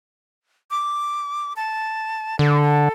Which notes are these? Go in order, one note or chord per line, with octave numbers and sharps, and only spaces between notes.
D6
A5
D3 A4